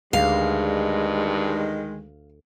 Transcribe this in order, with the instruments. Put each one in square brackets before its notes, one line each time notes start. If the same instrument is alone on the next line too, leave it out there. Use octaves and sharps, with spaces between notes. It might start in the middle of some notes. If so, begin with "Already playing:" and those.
[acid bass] D2 [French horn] G2 [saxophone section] D#3 G#3 [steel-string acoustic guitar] F5